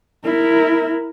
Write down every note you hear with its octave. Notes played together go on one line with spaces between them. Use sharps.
E4 A#4